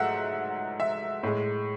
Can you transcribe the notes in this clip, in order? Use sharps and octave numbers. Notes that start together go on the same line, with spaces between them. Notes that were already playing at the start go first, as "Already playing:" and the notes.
Already playing: G#2 F#3 A3 E5 F#5
E5
A2 G#3